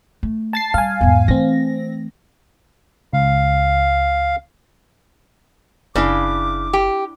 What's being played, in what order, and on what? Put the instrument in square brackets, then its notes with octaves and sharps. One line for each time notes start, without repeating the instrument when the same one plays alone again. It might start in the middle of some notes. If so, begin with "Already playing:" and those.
[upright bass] A3
[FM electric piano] A5 A6 C7
[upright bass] G3 [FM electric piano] F5 G#5
[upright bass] E2 G#2
[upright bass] E3 A3 [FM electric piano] C4 A#6
[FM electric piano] C#2 [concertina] F5
[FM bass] F#1 [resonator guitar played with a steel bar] C#3 [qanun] D4 E4 F5 [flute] D6
[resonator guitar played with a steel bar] G4